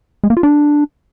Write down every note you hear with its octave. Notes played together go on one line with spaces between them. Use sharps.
G#3
A#3
F4
D4